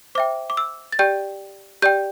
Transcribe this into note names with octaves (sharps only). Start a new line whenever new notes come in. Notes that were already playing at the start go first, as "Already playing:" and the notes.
C5 E5 G5 D6
D6
E6
A6
G4 D5 G5 G6
G4 D5 G5 G6